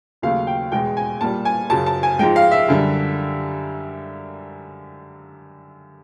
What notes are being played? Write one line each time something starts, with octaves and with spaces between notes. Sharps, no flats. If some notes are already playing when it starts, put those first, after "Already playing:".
D#2 C#3 F#3 A3 F5
G5
E2 B2 G#3 G5
G#5
A#2 G3 A5
G#5
F#2 C#3 F#3 A5
A5
G#5
G#2 F3 G#3 G5
F5
E5
F#2 D3 G3